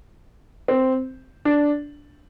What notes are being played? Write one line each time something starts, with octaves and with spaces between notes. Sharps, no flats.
C4
D4